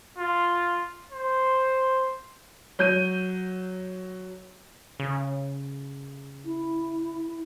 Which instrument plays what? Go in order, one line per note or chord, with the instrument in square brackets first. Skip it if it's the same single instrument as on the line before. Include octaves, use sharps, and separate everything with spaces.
[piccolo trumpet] F4
C5
[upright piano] F#3 G6 D#7
[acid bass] C#3
[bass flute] E4